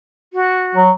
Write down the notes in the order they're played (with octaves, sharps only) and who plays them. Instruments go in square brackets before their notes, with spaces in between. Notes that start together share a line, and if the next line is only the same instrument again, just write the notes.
[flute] F#4
[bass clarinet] F#3